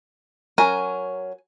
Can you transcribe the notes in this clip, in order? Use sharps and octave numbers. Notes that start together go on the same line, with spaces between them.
F#3 C#4 A#4 G#5